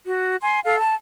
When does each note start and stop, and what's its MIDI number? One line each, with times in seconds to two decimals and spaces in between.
0.05 0.34 66
0.41 0.59 80
0.41 0.59 84
0.64 0.78 69
0.64 0.78 77
0.78 0.95 81